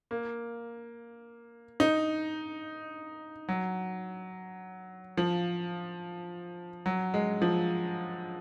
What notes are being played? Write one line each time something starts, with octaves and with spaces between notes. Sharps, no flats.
A#3
D#4
F#3
F3
F#3
G#3
F3